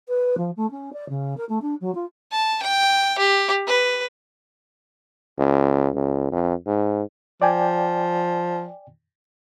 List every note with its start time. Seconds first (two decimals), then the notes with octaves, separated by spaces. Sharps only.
0.08 B4
0.37 F3
0.56 A3
0.70 C#4
0.93 D5
1.09 C#3
1.37 A#4
1.49 A3
1.61 D4
1.80 F#3
1.94 F4
2.32 A5
2.63 G5
3.18 G4
3.67 B4
5.38 C#2
5.95 C#2
6.32 F2
6.66 G#2
7.42 F3 D5 G5 G#5